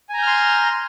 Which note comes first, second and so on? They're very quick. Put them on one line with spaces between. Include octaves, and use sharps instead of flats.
G#5 A#5 G6 F6 C6